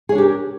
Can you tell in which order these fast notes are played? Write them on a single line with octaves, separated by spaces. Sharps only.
G#4 C#5 D4 G4 A#4